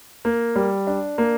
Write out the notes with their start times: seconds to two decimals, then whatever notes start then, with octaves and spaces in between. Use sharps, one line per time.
0.25 A#3
0.56 G3
0.87 D4
1.18 A#3